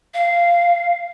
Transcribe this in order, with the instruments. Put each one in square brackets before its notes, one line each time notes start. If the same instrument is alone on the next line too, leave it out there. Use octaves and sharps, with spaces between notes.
[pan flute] F5